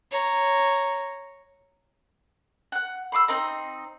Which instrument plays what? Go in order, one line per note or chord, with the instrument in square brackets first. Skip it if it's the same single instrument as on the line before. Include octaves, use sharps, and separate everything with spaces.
[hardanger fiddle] C#5 A#5
[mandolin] F#5 F#6
B5 C6 D6 E6
C4 D#4 D#5 A#5